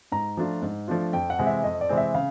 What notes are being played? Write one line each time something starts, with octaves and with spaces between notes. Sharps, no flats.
G#2 A#5
F3 A3 D4 F4
G#2
F3 A3 D4 F4
F2 G5
F#5
C3 E3 G#3 C4
E5
F2 D#5
D5
C3 E3 G#3 C4
E5
C#3 F5